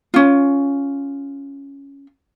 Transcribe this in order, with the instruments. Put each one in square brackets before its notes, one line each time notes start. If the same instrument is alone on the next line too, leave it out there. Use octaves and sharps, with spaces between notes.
[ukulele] C#4 F4